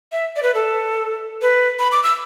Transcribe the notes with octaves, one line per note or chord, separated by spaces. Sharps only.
E5
D5
B4
A4
B4
B5
D6
E6